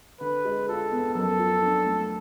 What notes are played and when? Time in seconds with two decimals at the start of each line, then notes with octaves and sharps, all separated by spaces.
0.20 D3 B4
0.45 G#3
0.68 F4 A4
0.91 B3
1.15 F#2 A4
1.39 F3
1.62 D4
1.86 A3